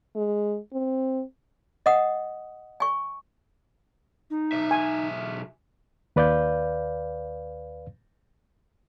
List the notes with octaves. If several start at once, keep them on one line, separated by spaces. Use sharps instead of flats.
G#3
C4
D#5 F#5 D#6
G#5 C#6
D#4
B1 E5
G#5
D#2 B4 D5 F5 G6